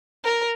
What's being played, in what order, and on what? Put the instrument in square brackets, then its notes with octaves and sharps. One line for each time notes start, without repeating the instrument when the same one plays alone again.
[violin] A#4